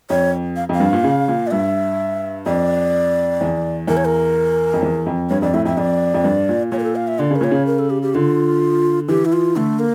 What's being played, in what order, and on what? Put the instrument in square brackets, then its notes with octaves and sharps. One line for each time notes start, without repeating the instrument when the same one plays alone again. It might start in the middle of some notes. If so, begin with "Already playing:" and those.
[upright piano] F2 [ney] C#5
[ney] F5
[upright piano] F2 [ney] F5
[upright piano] G2
A#2
C#3
A#2
[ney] D5
[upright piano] G2 [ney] E5
[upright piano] F2 [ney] D5
[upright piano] E2
[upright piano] E2 [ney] A#4
[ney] C#5
A#4
[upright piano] F2
E2
F2
[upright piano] G2 [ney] C#5
[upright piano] F2 [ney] D5
[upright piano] A2 [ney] E5
[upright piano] F2 [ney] E5
[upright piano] F2 [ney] D5
[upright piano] F2
G2
A#2
[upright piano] A#2 [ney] C#5
[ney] A#4
A4
F5
E5
[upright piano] D3 [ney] D5
[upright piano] C#3 [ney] A#4
[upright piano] A#2 [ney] C#5
[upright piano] C#3
[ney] A#4
A4
G4
G4
[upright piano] D3 [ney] F4
[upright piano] E3 [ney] G4
[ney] E4
F4
[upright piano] D3 [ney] A3
[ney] A#3